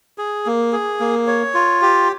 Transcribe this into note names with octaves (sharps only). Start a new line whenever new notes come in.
G#4
A#3
G#4
A#3
C#5
F4
G4